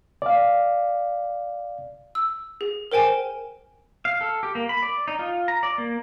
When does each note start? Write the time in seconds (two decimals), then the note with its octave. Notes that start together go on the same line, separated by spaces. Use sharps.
0.22 D5 F5
2.15 E6
2.61 G#4
2.92 A#4 C5 G5 G#5 E7
4.05 F5
4.21 A4
4.43 G4
4.55 A#3
4.69 B5
4.82 D5
5.08 D#4
5.19 F4
5.48 A#5
5.63 D5
5.78 A#3